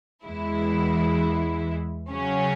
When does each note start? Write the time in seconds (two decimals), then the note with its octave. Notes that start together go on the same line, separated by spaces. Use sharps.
0.24 E2 E3 G#3 E4
2.11 C#3 F#3 C#4